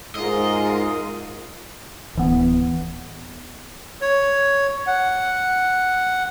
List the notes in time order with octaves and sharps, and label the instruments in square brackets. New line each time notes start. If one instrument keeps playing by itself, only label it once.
[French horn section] G#2 [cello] F4 A#4 [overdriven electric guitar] D#5
[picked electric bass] D1 E3 B3
[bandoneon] C#5
F#5